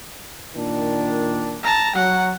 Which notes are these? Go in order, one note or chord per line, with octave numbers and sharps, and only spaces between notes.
A#2 D#3 D4
A5 A#5
F#3 F#5